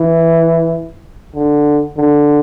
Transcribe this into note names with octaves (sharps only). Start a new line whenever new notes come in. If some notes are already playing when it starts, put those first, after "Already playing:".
Already playing: E3
D3
D3